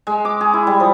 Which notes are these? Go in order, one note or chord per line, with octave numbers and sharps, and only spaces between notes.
G#3
D6
G#4
E4
G3
F3